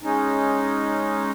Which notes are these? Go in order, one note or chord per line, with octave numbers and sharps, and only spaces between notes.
G#3 C#4 D#4